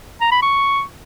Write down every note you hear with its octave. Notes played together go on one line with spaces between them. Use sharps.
A#5
B5
C#6